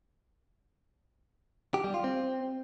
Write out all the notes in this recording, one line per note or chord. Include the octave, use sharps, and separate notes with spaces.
G4
G3
F4
C4